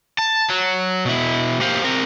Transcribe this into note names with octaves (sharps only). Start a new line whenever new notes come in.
A5
F#3
B2 E4
A#3 G4 C5 F5
C4 A#4